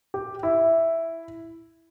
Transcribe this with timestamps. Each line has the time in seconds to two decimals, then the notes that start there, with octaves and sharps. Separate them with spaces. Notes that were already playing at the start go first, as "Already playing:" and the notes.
0.14 G4
0.43 E4